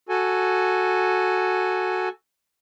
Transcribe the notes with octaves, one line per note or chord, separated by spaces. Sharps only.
F#4 A4 G#5